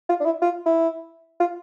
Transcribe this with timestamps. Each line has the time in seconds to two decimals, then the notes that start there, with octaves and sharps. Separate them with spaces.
0.09 F4
0.20 D4
0.25 E4
0.42 F4
0.66 E4
1.40 F4